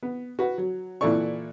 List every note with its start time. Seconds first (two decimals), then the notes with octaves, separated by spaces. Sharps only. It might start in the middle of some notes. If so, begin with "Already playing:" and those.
0.03 B3
0.39 F#4 B4
0.58 F#3
1.01 A#2 E3 E4 A4 D5 C#6